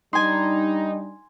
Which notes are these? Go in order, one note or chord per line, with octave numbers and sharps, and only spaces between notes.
G3 D4 D#4 G#5 C6